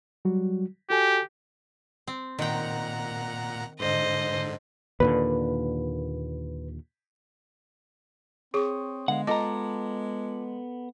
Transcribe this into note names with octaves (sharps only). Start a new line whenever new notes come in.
F#3 G3 F#4
F#4 G4 A4 G#5
C4
A#2 D#3 F#5 G5 A#5
G#2 D3 C5 D#5
D#2 A#2 D3 B4
C4 G#4 C#5 C#6 D#6
D3 G#3 B3 F5 F#5
B3 F4 A4 D#5 A5 A#5 D6